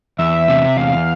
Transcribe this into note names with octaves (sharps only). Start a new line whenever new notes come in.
E2 E5
C3
E2 F5